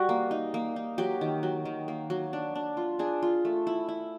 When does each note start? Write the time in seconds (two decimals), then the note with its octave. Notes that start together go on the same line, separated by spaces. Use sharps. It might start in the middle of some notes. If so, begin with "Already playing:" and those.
Already playing: G3 F#4
0.09 A#3
0.31 D#4
0.54 A#3
0.76 D#4
0.98 F#3 G4
1.21 D#3
1.43 F#3
1.65 D#3
1.88 A#3
2.10 F#3
2.33 D4
2.55 D4
2.77 F4
2.99 D4 G#4
3.23 F4
3.45 A3
3.67 E4
3.89 E4